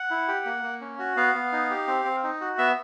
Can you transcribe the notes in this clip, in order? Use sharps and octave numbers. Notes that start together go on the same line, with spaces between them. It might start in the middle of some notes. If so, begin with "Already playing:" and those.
Already playing: F#5
E4
G4
A#3
A#3
C#4
F#4
B3 F5
B3
D#4
G4
C4
C4
D#4
F#4
B3 E5